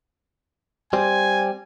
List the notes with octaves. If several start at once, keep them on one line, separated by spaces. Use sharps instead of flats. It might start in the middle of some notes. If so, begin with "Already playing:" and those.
G3 C4 G#5